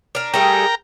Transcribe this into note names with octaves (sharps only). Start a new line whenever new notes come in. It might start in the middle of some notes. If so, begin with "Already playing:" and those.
D4 A#4
G3 A3 G#4 A#4 G5 A#5